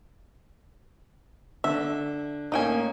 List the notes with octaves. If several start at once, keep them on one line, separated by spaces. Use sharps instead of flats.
D3 E5
A2 A#3 C#4 D#4 G5 G#5